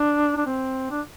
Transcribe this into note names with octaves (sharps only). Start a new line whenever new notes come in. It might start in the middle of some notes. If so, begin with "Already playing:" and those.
Already playing: D4
D4
C4
D4